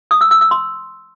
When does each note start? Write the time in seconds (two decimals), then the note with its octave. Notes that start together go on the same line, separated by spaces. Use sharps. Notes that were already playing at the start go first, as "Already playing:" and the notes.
0.11 D#6
0.21 E6
0.31 E6
0.41 E6
0.51 C6